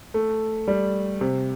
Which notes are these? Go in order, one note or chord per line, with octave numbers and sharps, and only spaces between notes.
A3
G3
C3